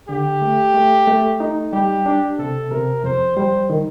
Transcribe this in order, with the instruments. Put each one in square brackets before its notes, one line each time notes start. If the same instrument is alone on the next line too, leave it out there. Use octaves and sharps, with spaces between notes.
[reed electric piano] D3 [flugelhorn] G4
[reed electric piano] A3
A3
A3
D#4
[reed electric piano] G3 [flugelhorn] G4
[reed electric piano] D4
[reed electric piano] C3 [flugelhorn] A4
[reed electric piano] C3 [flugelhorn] A#4
[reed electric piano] F2 [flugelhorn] C5
[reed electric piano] G3 [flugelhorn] C5
[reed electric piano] D#3